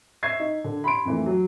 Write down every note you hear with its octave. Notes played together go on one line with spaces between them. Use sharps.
E5 C#6 G#6 C7
D#4
D3
B5 C6 D7
F2 E3 A3
F#3